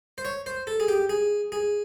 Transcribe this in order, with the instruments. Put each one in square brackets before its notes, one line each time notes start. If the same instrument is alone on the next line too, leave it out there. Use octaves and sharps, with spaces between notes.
[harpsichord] C5
C#5
C5
A4
G#4
G4
G#4
G#4